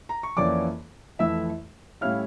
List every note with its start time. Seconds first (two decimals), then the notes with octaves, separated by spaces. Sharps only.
0.09 A#5
0.23 C#6
0.37 F2 E3 A#3 C#4 D5 D6
1.19 F2 E3 A3 E4 E5 E6
2.01 A2 G3 C#4 E4 F5 F6